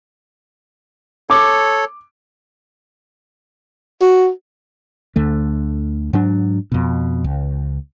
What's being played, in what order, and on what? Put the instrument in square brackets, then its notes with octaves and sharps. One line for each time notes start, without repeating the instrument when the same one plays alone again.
[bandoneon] A4 C#5 [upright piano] D6
[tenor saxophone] F#4
[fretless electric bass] D2 D3 A3
G#2 F#3 D4
F2 B2
C#2